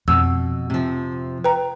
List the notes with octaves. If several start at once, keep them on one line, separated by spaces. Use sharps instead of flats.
F2 B2 E6
C3 F3
B4 G5 A#5